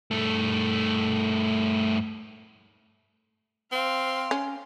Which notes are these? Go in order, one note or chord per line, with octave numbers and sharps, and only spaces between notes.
G2 A3
C4 F5 C6
C#4